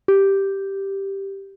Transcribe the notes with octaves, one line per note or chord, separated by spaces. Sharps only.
G4